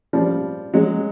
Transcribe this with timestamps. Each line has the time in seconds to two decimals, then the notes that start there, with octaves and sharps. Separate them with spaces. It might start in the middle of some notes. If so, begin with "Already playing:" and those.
0.13 F3 G3
0.74 F#3 G#3